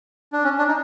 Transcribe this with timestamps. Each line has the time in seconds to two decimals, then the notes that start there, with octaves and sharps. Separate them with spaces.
0.33 D4
0.44 C#4
0.58 D4
0.68 D#4